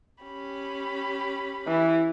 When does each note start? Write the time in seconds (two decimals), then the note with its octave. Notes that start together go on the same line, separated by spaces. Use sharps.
0.23 C#4 G4 B5
1.67 E3